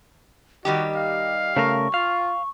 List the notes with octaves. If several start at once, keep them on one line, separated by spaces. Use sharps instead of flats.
D#3 G3 F#4 G4 D#5
F5
C#3 A3 A#4 C#6
F4 F5